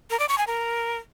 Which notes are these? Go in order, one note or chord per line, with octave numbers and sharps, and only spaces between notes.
A#4
D5
C#6
G#5
A#4